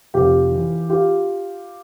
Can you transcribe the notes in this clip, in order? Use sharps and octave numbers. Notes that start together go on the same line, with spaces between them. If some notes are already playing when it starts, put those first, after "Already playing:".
F1 F4 G4
E3
F4 G4